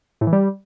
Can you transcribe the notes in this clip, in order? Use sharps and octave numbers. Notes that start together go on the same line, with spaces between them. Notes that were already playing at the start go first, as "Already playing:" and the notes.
A2
E3
G3